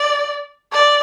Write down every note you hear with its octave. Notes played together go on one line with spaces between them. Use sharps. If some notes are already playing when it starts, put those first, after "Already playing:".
Already playing: D5
D5